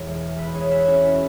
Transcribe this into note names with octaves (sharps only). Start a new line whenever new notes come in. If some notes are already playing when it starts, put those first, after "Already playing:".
Already playing: E1 E2 E3 G#3 G#4 C#5 E5
B4 E5
G#4 C#5
B4 E5
C#4 F#4
E4